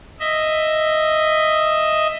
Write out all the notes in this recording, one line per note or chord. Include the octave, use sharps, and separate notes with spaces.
D#5 E5